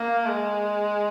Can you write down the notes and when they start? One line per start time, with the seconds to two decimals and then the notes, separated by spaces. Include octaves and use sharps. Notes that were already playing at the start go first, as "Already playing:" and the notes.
Already playing: A#3
0.26 G#3